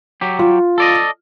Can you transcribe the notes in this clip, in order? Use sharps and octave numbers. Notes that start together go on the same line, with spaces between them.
F#3 G4
F4
A4 D5 D#5